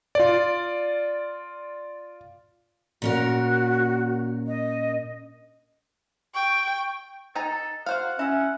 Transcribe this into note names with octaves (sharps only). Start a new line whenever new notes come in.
F4 D5
A#2 C#4 F#4 A#4
D#5
G5 C#6
D#4 A4 G#5 A#5
F#4 C5 F5 F#5
C#4 E4 E5 E6